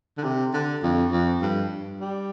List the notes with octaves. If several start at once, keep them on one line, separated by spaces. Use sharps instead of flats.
D3
C3
D3
F2
F2
G2
G3